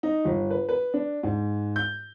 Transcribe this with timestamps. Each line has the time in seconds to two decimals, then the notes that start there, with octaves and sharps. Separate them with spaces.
0.03 D#4
0.25 G1
0.50 B4
0.69 B4
0.94 D4
1.23 G#2
1.76 G6